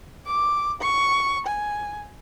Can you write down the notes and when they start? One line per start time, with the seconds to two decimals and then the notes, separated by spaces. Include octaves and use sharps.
0.26 D6
0.81 C#6
1.47 G#5